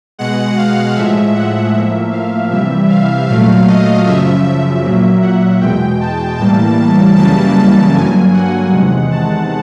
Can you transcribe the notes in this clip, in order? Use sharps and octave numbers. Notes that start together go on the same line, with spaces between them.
B2 G#3 F#5
F5
A2 F3 G#3 E5
F#5
A2 F3 A#3 E5
F5
C3 E3 G3 E5
F5
A#2 F#3 A3 F5
D#5
F#2 C#3 F3 E5
E5
A#2 F#3 A#3
F#5
E2 B2 G#3 G5
A5
A2 E3 G3 A#3 A5
F#2 C#3 E3 G3 A#3 A5
A5
G2 D3 F#3 A#3 G#5
F#5
E2 C3 D#3 G#3
A5